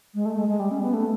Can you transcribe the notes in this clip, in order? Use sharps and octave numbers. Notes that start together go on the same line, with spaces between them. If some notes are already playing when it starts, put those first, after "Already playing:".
G#3
A3
G#3
G#3
G3
C#4
B3
A3